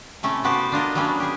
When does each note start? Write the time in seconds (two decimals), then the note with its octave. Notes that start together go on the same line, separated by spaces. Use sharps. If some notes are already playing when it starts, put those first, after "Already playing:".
0.23 C3 A3 C#4 E4
0.44 A3 B3 F#4 G4 C5 A5
0.72 D4 F4 A#4 D#5
0.95 F#3 G3 A#3 B3 C#4 D4
1.20 G4 G#4